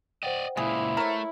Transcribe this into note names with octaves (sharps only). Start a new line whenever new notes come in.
C5 D5 D#5 F#5 G5
C#2 A#2 E4 G#4
A3 A#4 C#5